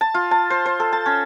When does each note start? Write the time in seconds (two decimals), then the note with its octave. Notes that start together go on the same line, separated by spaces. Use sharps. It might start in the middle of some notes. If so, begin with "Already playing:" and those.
0.01 A5
0.14 F4
0.31 A5
0.50 C5
0.66 C5
0.80 A4
0.93 A5
1.06 C#4